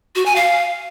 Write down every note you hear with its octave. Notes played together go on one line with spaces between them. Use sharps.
F#4
G#5
F5